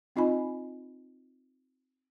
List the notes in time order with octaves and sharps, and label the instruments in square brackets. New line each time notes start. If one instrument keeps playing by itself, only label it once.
[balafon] C4 D#4 F4 D#5 G#5 B5